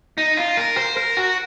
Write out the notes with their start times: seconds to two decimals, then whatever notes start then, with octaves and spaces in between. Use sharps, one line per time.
0.18 D#4
0.37 F4
0.57 A#4
0.77 C5
0.97 A#4
1.17 F#4